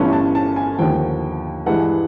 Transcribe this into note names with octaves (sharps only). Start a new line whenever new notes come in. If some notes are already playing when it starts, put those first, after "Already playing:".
Already playing: G1 G2 E3 A3 C#4
A5
A5
G#5
D#2 D3 F3 G5
G2 E3 G#3 F#5